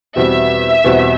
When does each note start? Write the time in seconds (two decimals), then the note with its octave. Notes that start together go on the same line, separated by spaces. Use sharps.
0.16 E2 B2 G3 C4 F#4 E5
0.84 E2 B2 G3 C4 F#4